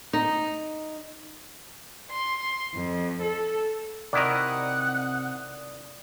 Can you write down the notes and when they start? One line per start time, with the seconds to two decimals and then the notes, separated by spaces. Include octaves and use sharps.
0.13 D#4
2.11 C6
2.75 F2
3.20 A4
4.13 C3 D#3 E4 A#4 D5 F#5 D#6